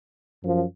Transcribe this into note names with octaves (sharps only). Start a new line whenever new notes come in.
F#2 F3